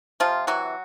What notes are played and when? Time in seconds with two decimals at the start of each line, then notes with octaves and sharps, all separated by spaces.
0.20 C3 F3 F4
0.47 E3 F#3 F#4